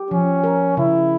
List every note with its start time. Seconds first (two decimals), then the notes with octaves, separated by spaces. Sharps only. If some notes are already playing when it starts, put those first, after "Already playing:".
Already playing: G4
0.11 F3 C#4
0.44 A#4
0.77 C#3 E4